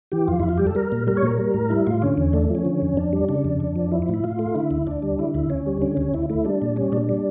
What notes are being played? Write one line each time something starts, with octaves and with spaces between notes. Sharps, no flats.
E3 G4
F2 F4
F2 E4
F4
G3 G4
A4
G3 A#4
A#2
G3 A#4
C#5
A#2 A#4
G3
A2
G3 E4
A2 F4
D3 C#4
E2
A3 D4
F3 C#4
D3
F2
F2 D4
G3
C#3 D4
F2
F2
F3
F3 E4
E4
A2
E4
A2 F4
A3
D3 E4
D2
D2 D4
G3
D3 E4
D2 E4
D2 C#4
G3
D3 C#4
D2
D2 E4
A3 E4
G3 D4
A#2
G3 C#4
A#2 D4
G3